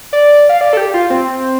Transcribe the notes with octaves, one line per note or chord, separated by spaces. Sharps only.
D5
F5
D5
A4
G4
F4
C4